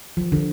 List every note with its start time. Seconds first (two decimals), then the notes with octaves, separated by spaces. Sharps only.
0.17 F3
0.32 D3